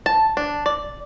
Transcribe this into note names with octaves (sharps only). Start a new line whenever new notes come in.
A5
D4
D5